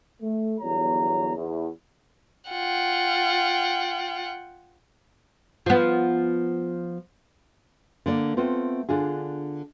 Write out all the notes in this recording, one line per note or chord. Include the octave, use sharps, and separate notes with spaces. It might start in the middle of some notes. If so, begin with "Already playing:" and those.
A3
G1 E2 F#3 C#5 A#5
E2
F4 F#5 G5
F3 B3
D3 A#3 D5
A3 B3 C4 F4
D3 D4 F4 G#4